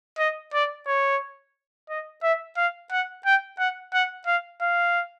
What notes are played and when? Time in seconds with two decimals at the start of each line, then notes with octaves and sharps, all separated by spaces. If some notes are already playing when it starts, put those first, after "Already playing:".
0.19 D#5
0.54 D5
0.87 C#5
1.89 D#5
2.23 E5
2.57 F5
2.91 F#5
3.25 G5
3.59 F#5
3.93 F#5
4.27 F5
4.62 F5